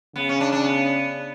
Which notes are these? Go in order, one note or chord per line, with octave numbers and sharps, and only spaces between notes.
C#3 B3
C#4
D4
D4
B3